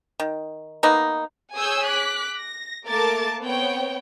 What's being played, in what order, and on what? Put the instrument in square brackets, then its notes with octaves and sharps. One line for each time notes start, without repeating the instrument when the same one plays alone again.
[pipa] D#3
A#3 B3 D#4
[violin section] G#4 C#5 G#5 D#6 E6 G6
D6 F#6 B6
A#6
A3 A#3 A#4 A5 D6 A6
B3 C4 C#5 G5